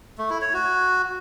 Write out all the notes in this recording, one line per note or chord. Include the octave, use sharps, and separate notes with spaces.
A3
E4
C#5
F#4